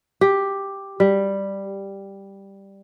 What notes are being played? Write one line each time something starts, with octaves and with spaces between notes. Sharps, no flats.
G4
G3